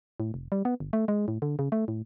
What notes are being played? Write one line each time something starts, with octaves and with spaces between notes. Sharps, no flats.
A2
F1
G3
B3
G1
A3
G#3
A2
D3
C#3
A3
A2